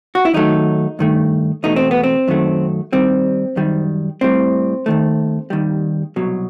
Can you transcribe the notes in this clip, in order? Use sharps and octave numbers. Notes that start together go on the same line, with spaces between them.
F#4
E4
D#2 D#3 F#3 A3 D#4
G2 D#3 A3
E2 B2 A3 D#4
C4
B3
C4
F#2 D#3 F#3 A3
D#2 D#3 G3 C4
F#2 D#3 G3
A2 G3 C4
D#2 D#3 A3
D#2 D#3 G3
C2 B2 F#3